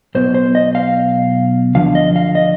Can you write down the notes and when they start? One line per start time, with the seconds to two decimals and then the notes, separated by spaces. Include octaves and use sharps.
0.15 B1 B2 C5
0.34 C5
0.55 D#5
0.75 F5
1.75 D2 D3 F3 F5
1.95 D#5
2.16 F5
2.35 D#5